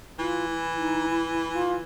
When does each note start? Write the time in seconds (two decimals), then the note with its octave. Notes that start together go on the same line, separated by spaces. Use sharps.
0.19 E3 F4
0.49 E4
0.79 D#4
1.09 E4
1.31 E4
1.54 F4